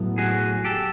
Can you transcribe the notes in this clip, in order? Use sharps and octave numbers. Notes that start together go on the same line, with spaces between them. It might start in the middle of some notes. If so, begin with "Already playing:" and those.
Already playing: A2 F#3 B3
F#4 G#4
G4 A4